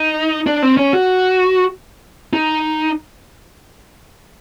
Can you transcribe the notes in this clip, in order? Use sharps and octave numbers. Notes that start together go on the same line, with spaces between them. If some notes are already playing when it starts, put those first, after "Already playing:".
Already playing: D#4
D4
C4
C#4
F#4
D#4